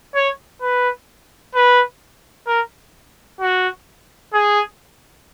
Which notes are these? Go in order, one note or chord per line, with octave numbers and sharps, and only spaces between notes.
C#5
B4
B4
A#4
F#4
G#4